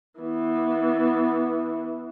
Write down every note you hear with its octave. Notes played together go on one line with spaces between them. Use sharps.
E3 B3